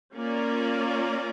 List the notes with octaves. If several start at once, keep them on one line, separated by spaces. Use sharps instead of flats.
A#3 C#4 F4 A#4 D5